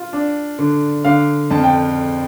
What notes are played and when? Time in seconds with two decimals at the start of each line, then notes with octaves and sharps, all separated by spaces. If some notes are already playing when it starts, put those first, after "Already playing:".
Already playing: F4
0.13 D4
0.59 D3
1.05 D3 F5
1.51 F2 A5
1.64 G5